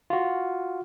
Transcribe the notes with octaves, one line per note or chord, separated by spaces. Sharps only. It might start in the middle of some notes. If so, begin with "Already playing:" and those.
F4 F#4